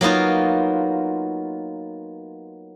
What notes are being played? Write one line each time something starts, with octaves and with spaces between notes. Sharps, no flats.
F#3 A#3 B3 D#4 F4